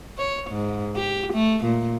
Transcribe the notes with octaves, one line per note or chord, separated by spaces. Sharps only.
C#5
G#2
G4
A3
A#2